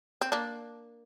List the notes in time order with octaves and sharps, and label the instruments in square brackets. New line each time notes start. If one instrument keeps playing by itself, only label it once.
[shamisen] C4
A#3 D4